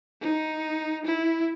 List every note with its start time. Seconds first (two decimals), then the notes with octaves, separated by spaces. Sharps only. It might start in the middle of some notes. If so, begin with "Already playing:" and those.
0.21 D#4
1.05 E4